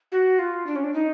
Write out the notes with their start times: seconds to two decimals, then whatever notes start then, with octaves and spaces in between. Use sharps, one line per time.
0.12 F#4
0.39 F4
0.67 D4
0.76 C#4
0.84 D4
0.94 D#4